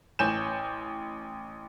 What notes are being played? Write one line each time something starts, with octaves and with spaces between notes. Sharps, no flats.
A1 C#5 G#5 G6 E7